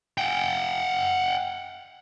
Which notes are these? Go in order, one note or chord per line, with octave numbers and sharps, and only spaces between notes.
F#5 G5